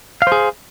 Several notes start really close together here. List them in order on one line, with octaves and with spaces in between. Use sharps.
F5 C5 G#4